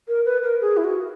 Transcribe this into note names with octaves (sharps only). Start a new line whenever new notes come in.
A#4
B4
A#4
G#4
E4
F#4